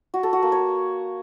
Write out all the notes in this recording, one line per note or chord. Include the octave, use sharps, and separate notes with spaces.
F#4
A4
F#4
A#3
C#5